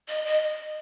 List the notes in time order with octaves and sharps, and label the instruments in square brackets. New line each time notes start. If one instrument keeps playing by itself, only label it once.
[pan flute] D#5
D#5